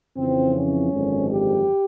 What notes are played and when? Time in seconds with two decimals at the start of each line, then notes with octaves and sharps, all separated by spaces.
0.17 F2 C#3 E3 C4
0.55 C#4
0.92 G#1 F#2 D3 F3 G#3
1.30 G4